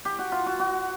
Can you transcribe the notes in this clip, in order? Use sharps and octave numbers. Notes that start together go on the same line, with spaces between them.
G4
F#4
F4
F#4
F#4